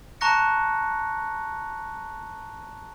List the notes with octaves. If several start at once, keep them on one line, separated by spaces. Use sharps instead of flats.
A5 A#5 C#6 F#6 A#6 C#7